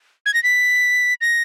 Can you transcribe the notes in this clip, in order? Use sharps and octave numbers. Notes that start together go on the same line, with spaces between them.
G#6
A#6
B6
A#6